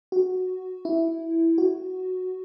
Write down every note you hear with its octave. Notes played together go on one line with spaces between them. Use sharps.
F#4
E4
F#4